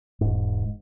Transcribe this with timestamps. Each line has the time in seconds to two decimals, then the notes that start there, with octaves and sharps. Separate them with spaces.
0.21 E1 G#2